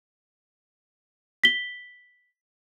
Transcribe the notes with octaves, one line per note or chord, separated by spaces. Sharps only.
B6 G7